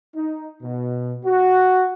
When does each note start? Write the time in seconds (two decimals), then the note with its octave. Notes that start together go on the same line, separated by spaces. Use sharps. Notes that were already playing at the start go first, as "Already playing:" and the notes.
0.15 D#4
0.63 B2
1.25 F#4